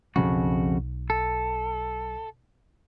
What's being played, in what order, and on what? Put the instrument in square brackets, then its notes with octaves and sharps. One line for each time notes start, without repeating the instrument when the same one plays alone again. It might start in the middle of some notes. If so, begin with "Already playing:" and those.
[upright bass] B1 [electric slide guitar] F2 C#3 F#4
[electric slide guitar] A4